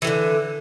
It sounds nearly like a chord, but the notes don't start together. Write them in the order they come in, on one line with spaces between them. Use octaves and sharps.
E3 G3 D3